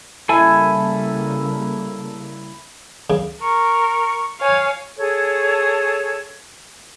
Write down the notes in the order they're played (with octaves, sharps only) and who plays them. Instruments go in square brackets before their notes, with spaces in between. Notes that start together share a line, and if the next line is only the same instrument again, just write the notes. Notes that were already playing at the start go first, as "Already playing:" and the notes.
[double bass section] C#3 G3 A#3 [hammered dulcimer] E4 [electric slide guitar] A4 G#5
[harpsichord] C#3
[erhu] A#4 [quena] C#6
[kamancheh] C#5 G#5 [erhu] F5
[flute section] G#4 A4 C#5